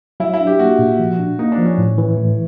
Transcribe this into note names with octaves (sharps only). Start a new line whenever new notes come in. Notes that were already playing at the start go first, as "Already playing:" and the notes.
F#3 E4
E4
D4
G4
A#3 F#4
A#2
F3
D4
A#3 D#4
D4
F3
C#4
A2
E3
A2